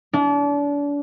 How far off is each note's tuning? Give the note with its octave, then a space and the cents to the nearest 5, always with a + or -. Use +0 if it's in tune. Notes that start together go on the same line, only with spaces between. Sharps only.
D4 -35